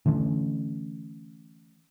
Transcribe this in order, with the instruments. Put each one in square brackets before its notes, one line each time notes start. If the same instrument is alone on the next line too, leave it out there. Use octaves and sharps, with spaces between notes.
[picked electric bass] D3 E3 A3 C#4